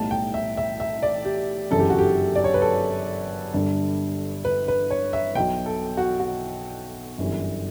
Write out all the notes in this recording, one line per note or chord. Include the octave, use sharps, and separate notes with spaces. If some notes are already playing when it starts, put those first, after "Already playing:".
Already playing: B1 A2 G3 A5
G5
E5
E5
E5
D5
G4
G1 F#2 C#3 E3 A4
G4
F#4
G4
D5
C#5
B4
A4
G1 G2 D3 G3
B4
B4
C#5
E5
B1 B2 F#3 G5
A4
F#4
F#4
G1 F#2 E3 G3